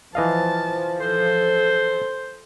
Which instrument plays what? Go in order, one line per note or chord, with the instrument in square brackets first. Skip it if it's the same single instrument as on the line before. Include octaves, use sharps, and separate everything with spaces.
[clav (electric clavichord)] E3 D#5 F5 [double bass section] F3 [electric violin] A5
[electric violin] A4 [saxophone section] C5